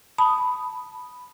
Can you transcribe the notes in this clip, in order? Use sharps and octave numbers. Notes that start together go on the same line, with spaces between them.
A5 B5 D#6